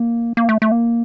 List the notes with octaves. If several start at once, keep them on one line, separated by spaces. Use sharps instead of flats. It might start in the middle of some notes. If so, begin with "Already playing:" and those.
Already playing: A#3
A#3
A3
A3
A#3